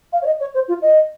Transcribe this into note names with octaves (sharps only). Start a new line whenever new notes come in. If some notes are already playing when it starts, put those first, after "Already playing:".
F5
C#5
D#5
C#5
C5
F4
D#5